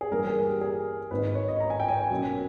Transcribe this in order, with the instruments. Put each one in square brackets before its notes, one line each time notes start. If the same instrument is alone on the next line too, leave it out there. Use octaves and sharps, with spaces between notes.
[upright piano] G#4
G1 G2 E3 A#3 A#4
G#4
G4
G#4
G#1 G#2 D#3 A#3 D#4 B4
C#5
D#5
A#5
G#5
G5
G#5
B1 B2 A#3 C#4